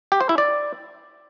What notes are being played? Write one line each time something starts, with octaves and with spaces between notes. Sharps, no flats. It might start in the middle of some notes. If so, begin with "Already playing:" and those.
G4
C5
E4
D5